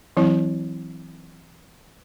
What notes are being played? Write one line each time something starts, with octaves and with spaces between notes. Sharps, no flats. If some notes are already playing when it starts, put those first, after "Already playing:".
E3 F#3 C4 E4